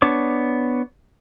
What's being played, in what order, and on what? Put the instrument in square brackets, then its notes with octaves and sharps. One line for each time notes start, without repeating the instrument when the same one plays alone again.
[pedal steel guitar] B3 D4 C#5 D6